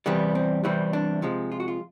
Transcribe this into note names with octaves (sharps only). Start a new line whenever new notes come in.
E2 C3 E3 G3 B3
C4
E2 C3 E3 G3 C4
D4
C3 F3 G#3
F4
F#4
F4